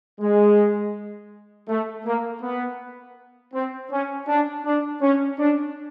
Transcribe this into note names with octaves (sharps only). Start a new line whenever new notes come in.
G#3
A3
A#3
B3
C4
C#4
D4
D4
C#4
D4